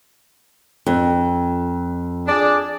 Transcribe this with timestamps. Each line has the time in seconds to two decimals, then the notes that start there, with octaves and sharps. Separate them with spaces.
0.86 F2
2.28 D4 G#4 D5